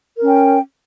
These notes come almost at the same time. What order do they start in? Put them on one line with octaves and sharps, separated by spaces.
A#4 C#4 G5